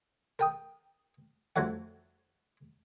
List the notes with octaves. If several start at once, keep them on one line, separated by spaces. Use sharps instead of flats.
A#4 G5 D#6
F2 D3 F#3 A3 F#5